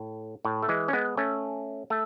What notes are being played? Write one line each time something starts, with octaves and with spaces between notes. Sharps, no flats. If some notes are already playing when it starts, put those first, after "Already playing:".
Already playing: A2
A2
A3
E3 G#3
C#4
G#3 B3
A3 C#4
A3